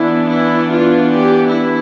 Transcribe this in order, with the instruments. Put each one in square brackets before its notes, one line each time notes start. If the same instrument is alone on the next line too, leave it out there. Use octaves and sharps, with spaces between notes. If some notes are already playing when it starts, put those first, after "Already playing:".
Already playing: [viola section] E3 B3 D4 E4
E4
F4
G4
E4